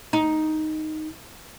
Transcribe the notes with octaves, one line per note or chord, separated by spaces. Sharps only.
D#4